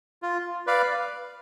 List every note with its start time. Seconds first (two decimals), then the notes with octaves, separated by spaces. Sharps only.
0.22 F4
0.67 B4 D5 F5